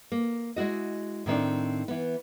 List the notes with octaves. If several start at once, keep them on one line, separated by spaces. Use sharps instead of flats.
A#3
G#3 E4 F#4 D#5
A2 D#3 C4 D4
E3 B3